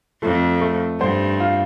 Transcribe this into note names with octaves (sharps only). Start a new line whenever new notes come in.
F2 A3
A3
G2 C5
F4